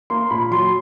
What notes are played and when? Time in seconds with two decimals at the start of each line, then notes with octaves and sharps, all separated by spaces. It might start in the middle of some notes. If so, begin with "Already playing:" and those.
0.10 A#3 C6
0.31 A#2 B5
0.51 F#3 C6